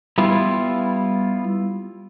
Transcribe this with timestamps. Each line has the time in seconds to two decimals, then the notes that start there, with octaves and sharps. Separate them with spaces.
0.18 G3 B3 E4 F4